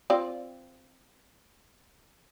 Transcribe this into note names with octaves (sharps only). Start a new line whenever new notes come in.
C4 F4 D5